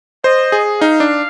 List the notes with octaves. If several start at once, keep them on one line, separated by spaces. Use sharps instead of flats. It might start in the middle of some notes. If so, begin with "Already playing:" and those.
C5 D#5
G#4
D#4 F5
D4